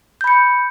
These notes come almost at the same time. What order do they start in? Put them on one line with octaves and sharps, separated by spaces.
G6 B5 C#7